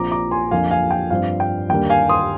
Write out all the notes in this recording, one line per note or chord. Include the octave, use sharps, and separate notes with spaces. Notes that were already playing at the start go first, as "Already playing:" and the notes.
Already playing: A#1 A#2 F3 C4 A#5 D6
A#5 D6
G#5 C6
F2 D3 F3 A#3 F5 G#5
F5 G#5
G5
G2 F3 C4 F5
G5
D#2 D3 G3 A#3 G5
F5 G#5
C6 D#6